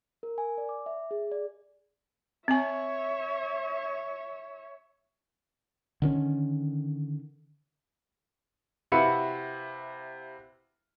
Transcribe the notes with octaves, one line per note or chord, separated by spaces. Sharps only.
A#4
G#5
D5
D6
E5
G#4
D5
C4 C#5 E5 G#5
D3 D#3 C#4
C3 E4 F#4 B4 F5 C#7